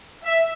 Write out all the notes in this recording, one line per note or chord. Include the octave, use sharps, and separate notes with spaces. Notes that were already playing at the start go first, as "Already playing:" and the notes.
E5